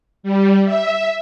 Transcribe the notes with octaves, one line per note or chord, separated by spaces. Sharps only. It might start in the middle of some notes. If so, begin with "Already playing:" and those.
G3
E5